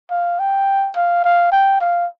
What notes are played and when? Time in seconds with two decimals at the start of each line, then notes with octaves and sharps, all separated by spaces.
0.10 F5
0.39 G5
0.96 F5
1.24 F5
1.52 G5
1.80 F5